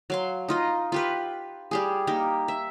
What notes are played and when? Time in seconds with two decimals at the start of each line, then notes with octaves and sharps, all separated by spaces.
0.10 F#3 F5 C6
0.48 D#4 F4 D#5
0.92 F4 G4 B4
1.71 G3 G4 G#4
2.07 A#3 D#4 G4
2.48 E5